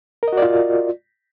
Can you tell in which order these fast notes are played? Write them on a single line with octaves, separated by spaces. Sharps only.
A#4 D#5 F#4 D5 F4